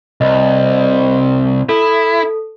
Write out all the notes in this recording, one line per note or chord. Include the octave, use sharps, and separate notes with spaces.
C2 D#5
E4 A4